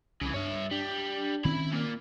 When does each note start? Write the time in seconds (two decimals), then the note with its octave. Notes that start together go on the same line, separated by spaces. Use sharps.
0.21 C2 C#3 E3
0.34 G2 C#5 E5
0.71 G3 D4
1.45 D#3 C4 C#4 E4 B5
1.72 A#2 A#3